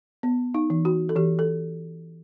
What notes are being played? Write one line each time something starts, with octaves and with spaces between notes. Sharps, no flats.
B3
D#4
E3
F#4
A4
E3 G4
A4